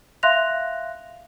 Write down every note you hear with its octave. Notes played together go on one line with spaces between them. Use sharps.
E5 F5 C6 F#6 A#6 F7